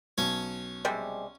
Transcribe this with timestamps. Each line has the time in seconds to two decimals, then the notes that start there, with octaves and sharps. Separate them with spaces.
0.18 B1 C#4 C#5
0.85 C3 G3 G#3